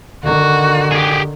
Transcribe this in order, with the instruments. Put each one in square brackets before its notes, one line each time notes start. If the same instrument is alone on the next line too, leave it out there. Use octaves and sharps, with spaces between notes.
[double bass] D3 D#3 [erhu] F#4
[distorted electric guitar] G4 G#4